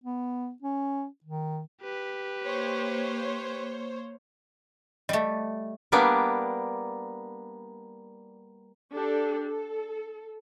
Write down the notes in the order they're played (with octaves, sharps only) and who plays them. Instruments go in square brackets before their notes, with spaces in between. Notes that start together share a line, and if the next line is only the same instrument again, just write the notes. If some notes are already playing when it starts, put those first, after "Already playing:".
[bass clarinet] B3
C#4
D#3
[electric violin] G4 B4
[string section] A#3 C5 C#5
[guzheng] G3 A3 [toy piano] D#5
[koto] G3 A#3 B3 D4
[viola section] D4 G4 A4
A4